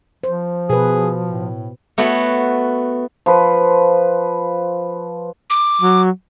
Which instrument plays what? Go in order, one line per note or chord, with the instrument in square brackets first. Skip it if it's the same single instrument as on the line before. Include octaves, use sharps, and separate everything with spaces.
[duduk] F3 [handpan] C5
[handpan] B2 B4 [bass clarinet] G#4
[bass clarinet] A2
[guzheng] A3 B3 F#4 C#5
[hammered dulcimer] F3 B4
[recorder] D6
[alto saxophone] F#3